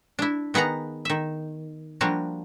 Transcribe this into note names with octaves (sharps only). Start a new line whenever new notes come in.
D4 E4
D#3 B3 G#4 F#5 A#5
D#3 E5
F3 G3 A#3 D4 F#4